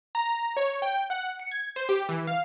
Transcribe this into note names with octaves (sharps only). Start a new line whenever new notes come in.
A#5
C#5
G5
F#5
C#7
G#6
C5
G4
E3
F5